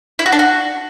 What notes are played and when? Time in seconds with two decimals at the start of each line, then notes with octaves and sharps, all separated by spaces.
0.19 E4
0.26 F#4
0.32 D4
0.39 F#4